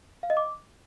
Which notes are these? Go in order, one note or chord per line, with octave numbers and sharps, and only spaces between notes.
F5
D#5
D6